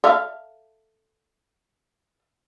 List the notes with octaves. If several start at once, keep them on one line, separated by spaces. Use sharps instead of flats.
A4 E5 F5